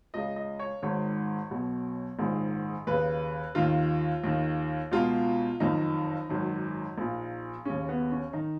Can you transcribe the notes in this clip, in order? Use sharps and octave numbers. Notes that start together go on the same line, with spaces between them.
C#2 C#3 D#5
D#5
C#5
G#1 G#2 D#3 C#5
B1 B2
A#1 G#2 D#3
D#2 C#3 B4
D#2 D#3 F4
D#2 D#3
C#2 B2 F4
F#1 F2 D#3 D#4
G#1 F#2 D#3
A#1 A#2
D#2 C#3 C#4
B3
C#4
D#3 D#4